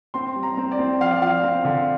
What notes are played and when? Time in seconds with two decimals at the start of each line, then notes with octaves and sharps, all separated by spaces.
0.14 C4 C6
0.36 G3
0.43 A#5
0.57 C4
0.72 D5
0.79 C4
1.00 F3 F5
1.11 D5
1.22 F3 F5
1.43 C4
1.65 D3